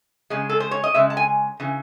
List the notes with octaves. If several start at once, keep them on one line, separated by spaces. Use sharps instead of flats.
C#3 G#3
A4
C5
C#5
D#5
C#3 G#3 E5
A5
G#5
C#3 E3